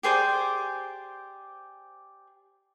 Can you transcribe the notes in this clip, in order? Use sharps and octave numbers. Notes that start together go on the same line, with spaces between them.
G4 G#4 C5 D5